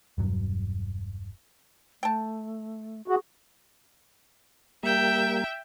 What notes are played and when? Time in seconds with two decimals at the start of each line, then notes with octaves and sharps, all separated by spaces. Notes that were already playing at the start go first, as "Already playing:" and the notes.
0.18 E1 G2 F#3
2.03 A3 G5 A5
3.08 F#4 G#4
4.83 G3 A#3 E5 G5